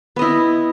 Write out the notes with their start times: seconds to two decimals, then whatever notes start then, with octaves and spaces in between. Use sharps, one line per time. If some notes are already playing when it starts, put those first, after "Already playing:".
0.16 B3
0.19 D#5
0.22 E4